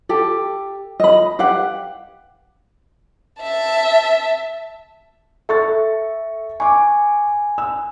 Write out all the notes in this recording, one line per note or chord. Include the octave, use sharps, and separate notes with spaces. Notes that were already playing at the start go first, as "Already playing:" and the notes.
G4 A4
D#5 B5
G4 B4 F5 F#5
E5 A5
A4 E5 C#6 A6
G#5 C#6 D6
E6